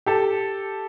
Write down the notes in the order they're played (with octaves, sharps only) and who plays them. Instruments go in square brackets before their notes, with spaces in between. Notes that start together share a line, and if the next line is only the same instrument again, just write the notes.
[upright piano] G4 A4